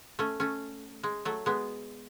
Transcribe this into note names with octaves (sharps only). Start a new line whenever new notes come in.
A3 C#4
A3 C#4
G#3
F#3 A3
G#3 B3